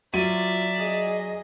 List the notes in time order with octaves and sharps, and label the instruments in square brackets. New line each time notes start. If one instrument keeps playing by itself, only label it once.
[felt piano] F#3 D#7 [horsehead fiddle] F4 [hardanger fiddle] D5 E5
[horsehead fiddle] G#4 D#5